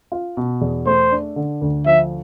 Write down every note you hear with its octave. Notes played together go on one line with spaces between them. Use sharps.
F4
B2
E2
A3 C5
D4
D3
D2
F3 E5